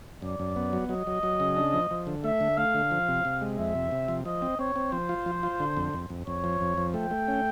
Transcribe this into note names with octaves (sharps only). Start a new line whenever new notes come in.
F#2 D5
F#2
B3
F#3
F#3 D#5
F#3
F#3
C#3
D4
F3
F3
D3
A3 E5
D3
A3 F5
D3
F3
C3
C3
G#3
F2 E5
C3
C3
F3
F3 D#5
C4
C4 C#5
C4
F3 C5
F4
F3
F4
D3
F2
F2
F2
F2 C#5
F3
F2
F3
A3 G5
A3
C#4